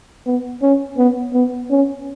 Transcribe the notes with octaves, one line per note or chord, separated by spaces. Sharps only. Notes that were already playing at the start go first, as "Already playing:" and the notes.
B3
C#4
B3
B3
C#4